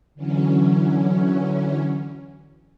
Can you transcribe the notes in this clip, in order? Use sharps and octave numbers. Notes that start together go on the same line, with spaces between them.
D3 E3 F#3 C#4